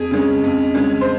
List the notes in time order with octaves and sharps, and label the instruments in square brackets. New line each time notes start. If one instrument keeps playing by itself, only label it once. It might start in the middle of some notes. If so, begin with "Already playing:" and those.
Already playing: [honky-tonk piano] F2 G#4
C#3 G#3 C#4
F2
C#3 G#3 C#4
C5